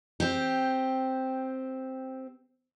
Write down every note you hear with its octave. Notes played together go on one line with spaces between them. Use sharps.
C4 G4